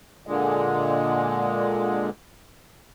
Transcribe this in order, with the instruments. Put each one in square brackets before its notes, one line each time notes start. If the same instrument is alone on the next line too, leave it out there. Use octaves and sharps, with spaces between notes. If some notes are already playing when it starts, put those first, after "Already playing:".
[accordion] A#2 D3 G#3